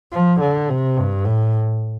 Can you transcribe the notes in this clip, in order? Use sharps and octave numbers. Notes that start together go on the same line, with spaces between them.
F3
D3
C3
G2
A2